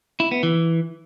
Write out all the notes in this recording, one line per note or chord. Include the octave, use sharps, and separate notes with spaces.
E4
B3
E3